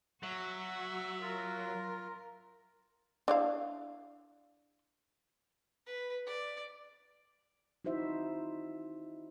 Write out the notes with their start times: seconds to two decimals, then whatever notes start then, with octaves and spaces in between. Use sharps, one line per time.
0.23 F#3 F#4 E5
1.22 F4 A#4
3.28 D4 E4 F5
5.86 B4
6.26 D5
7.85 D#4 E4 F#4 C5 E5